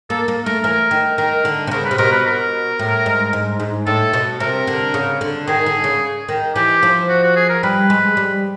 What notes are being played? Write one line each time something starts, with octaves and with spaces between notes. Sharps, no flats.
A#3 A4
A#3
A3 A#4
E3 A#4
D#3
D#3 A#4
D3
C3
C#3 A#4
B4
C3
B2 A#4
B4
A#4
A2
G#2
G#2
G#2
A2 A4
B2
C3 A#4
D3
C#3
D3
D#3 G#4
D3
C#3
D#3
E3 G4
F3
F#4
F#4
G#4
A#4
G3 B4
G#3
G3